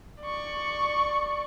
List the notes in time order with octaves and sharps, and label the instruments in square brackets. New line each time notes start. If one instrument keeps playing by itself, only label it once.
[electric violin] D5 C#6